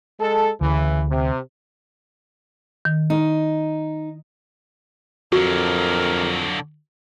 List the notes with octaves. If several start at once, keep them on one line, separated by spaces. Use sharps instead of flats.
G#3 A4
D2 C#3 E3
C3
D#3
D#4
F2 D3 F#3 F#4 A#4